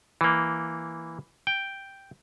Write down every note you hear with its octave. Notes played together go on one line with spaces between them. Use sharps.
E3 A#3
G5